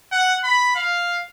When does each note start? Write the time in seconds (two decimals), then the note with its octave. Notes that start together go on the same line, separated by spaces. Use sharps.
0.12 F#5
0.44 B5
0.75 F5